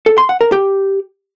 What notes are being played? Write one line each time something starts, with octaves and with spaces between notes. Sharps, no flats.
A4
C6
F#5
A#4
G4